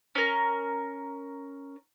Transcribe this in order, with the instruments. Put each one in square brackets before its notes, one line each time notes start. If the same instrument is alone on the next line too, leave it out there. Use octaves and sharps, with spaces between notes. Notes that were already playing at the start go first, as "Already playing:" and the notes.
[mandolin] C#4 A#4